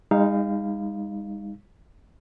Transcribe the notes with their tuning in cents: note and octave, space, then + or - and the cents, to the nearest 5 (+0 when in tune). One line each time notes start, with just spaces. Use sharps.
G#3 -45 D#4 +0 F5 -10